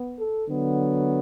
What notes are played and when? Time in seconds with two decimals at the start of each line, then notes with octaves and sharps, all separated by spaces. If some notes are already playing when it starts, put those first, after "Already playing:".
Already playing: B3
0.19 A4
0.47 D3 F#3 B3